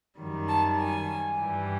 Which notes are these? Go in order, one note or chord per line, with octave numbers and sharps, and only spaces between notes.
F#2 D#3 G3
A5
G#5
G2 E3 G3